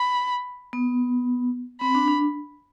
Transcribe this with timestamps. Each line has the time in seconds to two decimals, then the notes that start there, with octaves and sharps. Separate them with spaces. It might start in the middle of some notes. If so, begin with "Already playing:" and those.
Already playing: B5
0.73 B3
1.81 C4 B5
1.95 D4
2.08 D4